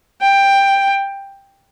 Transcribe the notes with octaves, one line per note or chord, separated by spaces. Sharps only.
G5